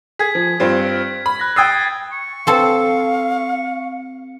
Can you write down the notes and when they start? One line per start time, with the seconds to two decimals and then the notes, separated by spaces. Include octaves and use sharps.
0.19 G#4 G#6 B6
0.35 F3
0.60 G2 C4 F4
1.26 B5
1.40 F#6 A#6
1.56 G5 D#6 E6 G#6 A6 C7
2.12 C#6
2.47 C4 A4 F5